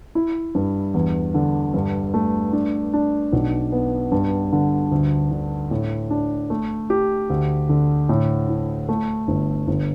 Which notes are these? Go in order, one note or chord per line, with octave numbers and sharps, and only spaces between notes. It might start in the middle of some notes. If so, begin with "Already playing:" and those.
E4
G2
E2
D3
G2
A3
D4
D4
B1
B3
G2
D3
D2
D3
A2
D4
A3
G4
D2
D3
A2
E4
A3
G1
G1